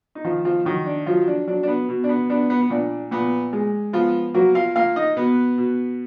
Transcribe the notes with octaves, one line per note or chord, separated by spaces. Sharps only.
D#4
D#3 F3 F4
F3 F4
D#3 F#3 F#4
D4
F3 F#3 F4
D4
F#3 D4
D4
B3
B2
D4
B3
B3 D4
B3
B3
A#2 D4
A#2 B3
G#3
F3 B3 F4
F#3 A#3 F#4
F4 F5
A#3 F4 F5
D#4 D#5
B2 B3 B4
B2